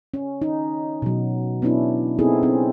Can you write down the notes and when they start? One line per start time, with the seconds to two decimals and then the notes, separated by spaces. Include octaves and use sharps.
0.14 C#4
0.42 D#4
1.02 B2 F#3
1.62 B3 C#4 D4 E4
2.19 B3 C4 D#4 E4 G#4 A4
2.43 C4 C#4